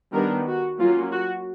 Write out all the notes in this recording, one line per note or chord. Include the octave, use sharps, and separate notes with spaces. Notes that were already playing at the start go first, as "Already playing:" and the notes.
D#3 G3 B3 D4 A#4
F#4
F#3 A#3 C#4 F4
F#4